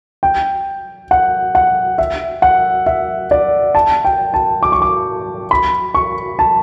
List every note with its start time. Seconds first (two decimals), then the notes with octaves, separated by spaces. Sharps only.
0.23 G5
1.11 F#5
1.55 F#5
1.98 E5
2.42 F#5
2.86 E5
3.31 D5
3.75 A5
4.05 G5
4.34 A5
4.63 D6
4.72 C#6
4.82 D6
5.51 B5
5.95 C#6
6.39 A5